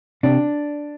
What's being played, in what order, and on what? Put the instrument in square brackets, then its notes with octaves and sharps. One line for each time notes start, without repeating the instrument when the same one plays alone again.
[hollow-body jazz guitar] C3 D4